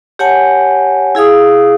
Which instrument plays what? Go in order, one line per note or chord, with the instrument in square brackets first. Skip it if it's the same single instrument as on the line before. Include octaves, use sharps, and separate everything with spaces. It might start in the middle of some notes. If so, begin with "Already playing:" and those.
[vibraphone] G4 C#5 F#5 G#5 A5
E4 G#4 F5 D#6